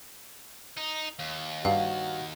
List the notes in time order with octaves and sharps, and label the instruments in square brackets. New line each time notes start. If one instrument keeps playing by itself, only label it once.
[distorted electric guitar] D#4
D#2
[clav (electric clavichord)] G2 [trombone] F#4 [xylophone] F5